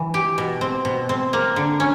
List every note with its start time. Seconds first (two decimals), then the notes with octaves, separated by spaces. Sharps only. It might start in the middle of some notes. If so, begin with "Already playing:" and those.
Already playing: E3
0.14 G4
0.38 B2
0.61 C4
0.85 B2
1.09 C4
1.33 A#3
1.56 D3
1.80 C#4